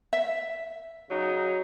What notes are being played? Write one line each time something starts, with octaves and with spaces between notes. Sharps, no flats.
E5
C#3 F#3 D#4